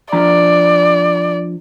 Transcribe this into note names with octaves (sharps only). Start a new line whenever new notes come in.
F3 D4 D5 A#5